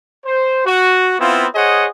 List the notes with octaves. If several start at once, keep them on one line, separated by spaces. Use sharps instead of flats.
C5
F#4
B3 C4 E4 F4
G#4 C5 C#5 D#5 F#5